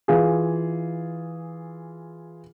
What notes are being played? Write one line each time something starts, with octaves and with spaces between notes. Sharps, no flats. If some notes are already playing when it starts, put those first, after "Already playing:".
E3 F4 G#4